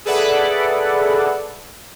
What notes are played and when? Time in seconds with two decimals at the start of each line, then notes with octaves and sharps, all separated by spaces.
0.05 G#4 A4 B4 D5 E5 F#5